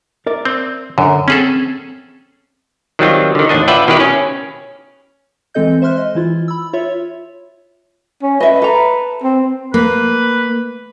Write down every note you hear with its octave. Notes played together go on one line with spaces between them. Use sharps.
A#4 D5 E5
C4
F#2 D3
C4 C#4 G#4 A4
D#3 F#3 G3 C4 F4
D3 D#3
A1 D#2 D4 D#5
F4 B4 D5 E5 F#5 G5
B2 D#3 E4 G4 B4
C#4
E3 G#3 C4 A4 D#5 G6
C5 E5 C6 F6 F#6
D#5
E3 E4 F4
B5 E6
F4 C#5 E5
C#4
B4 D#5 E5
A4 A#5
C4
A#3 B4